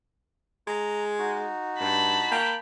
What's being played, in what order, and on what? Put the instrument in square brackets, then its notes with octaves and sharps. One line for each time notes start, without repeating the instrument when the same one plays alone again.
[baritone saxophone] G#3 [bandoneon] A#5
[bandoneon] D#4 F#4
[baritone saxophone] G2 [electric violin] A5 B5
[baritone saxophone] A#3 [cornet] G5